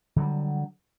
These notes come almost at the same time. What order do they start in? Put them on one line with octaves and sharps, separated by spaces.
D3 F#3 G3